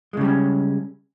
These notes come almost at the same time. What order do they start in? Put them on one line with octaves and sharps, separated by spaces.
G#3 C#3 G3 C#4